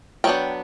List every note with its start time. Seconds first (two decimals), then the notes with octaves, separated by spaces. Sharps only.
0.24 F#3 B3 D4 G5